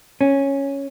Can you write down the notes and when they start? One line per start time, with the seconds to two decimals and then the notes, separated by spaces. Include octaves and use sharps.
0.21 C#4